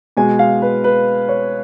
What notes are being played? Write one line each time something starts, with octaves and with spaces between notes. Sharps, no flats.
B2 G#3 G#5
F5
B4
B4
C#5